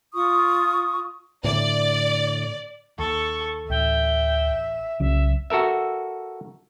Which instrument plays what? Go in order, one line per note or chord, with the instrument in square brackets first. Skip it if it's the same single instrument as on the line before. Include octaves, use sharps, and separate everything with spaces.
[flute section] F4 C#6 D#6
[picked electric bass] A2 D3 [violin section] D5
[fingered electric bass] D#2 [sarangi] A4 [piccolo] C#6
[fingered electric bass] A1 [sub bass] D2 [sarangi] E5 [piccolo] G5
[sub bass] C2 [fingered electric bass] C#3 F#3 C#4 [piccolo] E5
[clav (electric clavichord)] F#4 A4 A#4 E5